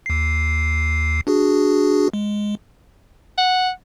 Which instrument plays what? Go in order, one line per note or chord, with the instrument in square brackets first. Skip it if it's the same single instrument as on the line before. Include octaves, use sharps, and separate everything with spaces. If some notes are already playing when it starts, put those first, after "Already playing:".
[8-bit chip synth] D#2 C7
D4 F#4 G#4
G#3
[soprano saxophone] F#5